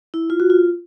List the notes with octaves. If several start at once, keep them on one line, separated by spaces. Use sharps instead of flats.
E4
F4
F#4
F4